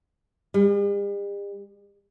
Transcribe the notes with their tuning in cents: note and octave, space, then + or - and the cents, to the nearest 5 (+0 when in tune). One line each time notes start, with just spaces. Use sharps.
G3 +45